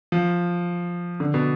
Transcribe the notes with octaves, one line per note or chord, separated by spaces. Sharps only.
F3
D3
B2